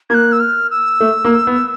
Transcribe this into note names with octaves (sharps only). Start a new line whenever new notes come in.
A#3 F#6 G#6
E6
F6
E6
A3
A#3
B3